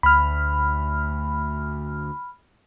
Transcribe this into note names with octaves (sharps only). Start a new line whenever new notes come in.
D2 B5 F6